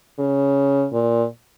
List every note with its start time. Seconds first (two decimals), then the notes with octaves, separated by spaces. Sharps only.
0.19 C#3
0.93 A#2